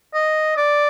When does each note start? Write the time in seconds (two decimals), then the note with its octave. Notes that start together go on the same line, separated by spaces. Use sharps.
0.14 D#5
0.57 D5